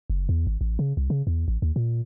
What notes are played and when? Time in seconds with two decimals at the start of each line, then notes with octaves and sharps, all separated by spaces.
0.10 F#1
0.29 E2
0.47 G#1
0.61 A1
0.79 C#3
0.97 C2
1.10 C#3
1.27 E2
1.48 A1
1.62 D#2
1.76 A#2